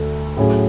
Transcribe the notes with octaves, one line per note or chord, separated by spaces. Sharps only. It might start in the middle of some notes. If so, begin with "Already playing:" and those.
Already playing: D2 D3 A3
A2 F#3 C#4 G#4